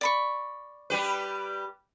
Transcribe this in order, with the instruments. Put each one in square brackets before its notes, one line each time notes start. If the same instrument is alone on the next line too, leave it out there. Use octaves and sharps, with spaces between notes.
[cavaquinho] D5 B5 C#6
[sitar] G3 G4 B4